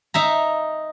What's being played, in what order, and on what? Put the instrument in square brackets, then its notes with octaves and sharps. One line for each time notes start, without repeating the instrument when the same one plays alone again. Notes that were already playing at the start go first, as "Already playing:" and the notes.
[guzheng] D#4 E5 A#5